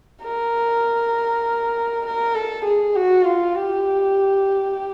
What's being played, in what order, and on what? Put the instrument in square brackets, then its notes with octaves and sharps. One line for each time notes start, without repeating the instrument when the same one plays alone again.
[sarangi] A#4
A#4
A4
G#4
F#4
F4
G4